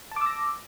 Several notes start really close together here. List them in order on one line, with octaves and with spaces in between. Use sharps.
A5 D6 E6 A#6